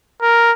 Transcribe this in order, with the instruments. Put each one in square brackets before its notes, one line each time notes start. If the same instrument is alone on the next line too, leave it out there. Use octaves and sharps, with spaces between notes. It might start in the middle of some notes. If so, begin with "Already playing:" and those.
[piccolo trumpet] A#4